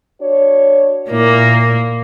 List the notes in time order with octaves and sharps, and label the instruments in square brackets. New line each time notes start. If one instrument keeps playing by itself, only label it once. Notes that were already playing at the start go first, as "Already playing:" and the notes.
[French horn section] D4 F#4 C#5
[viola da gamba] A#2 A#3 [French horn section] E4 A#4